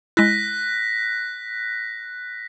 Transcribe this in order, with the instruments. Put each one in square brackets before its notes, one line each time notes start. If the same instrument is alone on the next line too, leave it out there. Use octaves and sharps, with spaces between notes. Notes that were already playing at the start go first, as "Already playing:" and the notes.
[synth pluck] G#3 E4 [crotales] F#6 A#6 B6